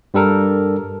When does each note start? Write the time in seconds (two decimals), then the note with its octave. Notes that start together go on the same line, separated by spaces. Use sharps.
0.14 G2 G3 A4 A#4